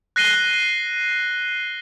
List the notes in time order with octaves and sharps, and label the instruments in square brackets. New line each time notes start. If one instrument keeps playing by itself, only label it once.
[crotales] F#6 A#6 C7 D#7 G7